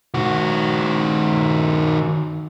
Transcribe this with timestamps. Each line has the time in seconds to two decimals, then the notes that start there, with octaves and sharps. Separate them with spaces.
0.14 D#3 F#4